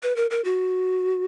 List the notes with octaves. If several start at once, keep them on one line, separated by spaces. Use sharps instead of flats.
B4
A#4
A#4
F#4